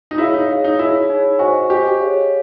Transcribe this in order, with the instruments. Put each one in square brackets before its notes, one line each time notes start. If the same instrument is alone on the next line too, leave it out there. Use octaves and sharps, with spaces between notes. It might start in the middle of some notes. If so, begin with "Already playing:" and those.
[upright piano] D#4
[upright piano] E4 [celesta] G#4 C#5 F5
[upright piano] D#4
[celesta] G#4 C#5 F5
[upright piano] D#4
[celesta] D#4 G#4 C#5 [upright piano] E4
[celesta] D#4 G#4 C#5
[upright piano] F#4 [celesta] C5 D#5 G#5 C#6
[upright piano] G4 [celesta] C5 D#5 G#5 C#6
[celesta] G#4 C#5 F5